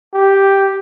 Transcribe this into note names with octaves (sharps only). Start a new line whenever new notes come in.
G4